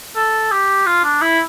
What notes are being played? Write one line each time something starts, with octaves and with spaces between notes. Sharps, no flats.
A4
G4
F4
D4
E4